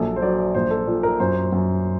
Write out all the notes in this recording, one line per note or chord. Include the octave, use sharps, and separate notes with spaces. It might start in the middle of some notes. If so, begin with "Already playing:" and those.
Already playing: A#1 F#3 A4
C5
F#3 D5
A#1 C5
A4
A#2
A#4
F#2 C5
F#2